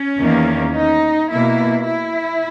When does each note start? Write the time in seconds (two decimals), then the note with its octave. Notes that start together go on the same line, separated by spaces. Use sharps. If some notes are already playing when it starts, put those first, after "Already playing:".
Already playing: C#4
0.20 E2 D#3 A#3
0.75 D#4
1.30 B2 A#3 E4
1.85 E4